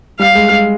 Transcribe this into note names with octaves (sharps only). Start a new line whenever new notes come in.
G3 F5
G#3
G#3